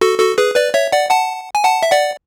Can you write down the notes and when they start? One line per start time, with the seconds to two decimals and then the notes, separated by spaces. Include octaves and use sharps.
0.01 F#4 A4
0.20 F#4 A4
0.38 G#4 B4
0.56 B4 D5
0.74 C#5 E5
0.92 D5 F#5
1.10 F#5 A5
1.55 G#5
1.65 F#5 A5
1.83 E5
1.92 D5 F#5